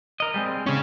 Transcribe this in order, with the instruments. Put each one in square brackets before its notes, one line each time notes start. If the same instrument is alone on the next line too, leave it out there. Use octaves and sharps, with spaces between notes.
[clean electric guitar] A#4 D#5
G3 G#3 C4
[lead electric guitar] C#3 C#4